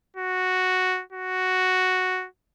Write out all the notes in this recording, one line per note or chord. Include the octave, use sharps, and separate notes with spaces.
F#4
F#4